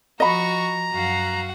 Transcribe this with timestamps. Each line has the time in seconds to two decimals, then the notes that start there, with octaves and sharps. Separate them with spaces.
0.20 F3 F#4 D#5 A#5 B5 C#6
0.92 F#2 F#4 F5 F#5